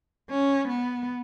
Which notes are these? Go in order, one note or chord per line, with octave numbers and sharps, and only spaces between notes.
C#4
B3